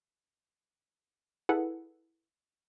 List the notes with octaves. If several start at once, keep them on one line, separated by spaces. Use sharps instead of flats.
E4 G#4 A4 B4 F#5